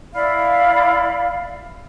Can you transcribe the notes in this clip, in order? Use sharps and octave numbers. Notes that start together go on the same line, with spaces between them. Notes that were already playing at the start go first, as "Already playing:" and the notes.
E4 D5 F5 B5